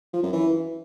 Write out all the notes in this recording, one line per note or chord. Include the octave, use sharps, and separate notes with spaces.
F3
F#2
E3